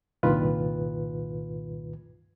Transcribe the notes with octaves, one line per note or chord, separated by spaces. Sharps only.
C2 G2 A#2 D#3 F4 B4